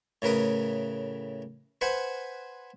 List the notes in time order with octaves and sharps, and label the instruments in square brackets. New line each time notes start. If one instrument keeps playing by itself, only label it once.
[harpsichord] A2 C#3 A#4 B4 D#6
B4 C5 F#5 G#5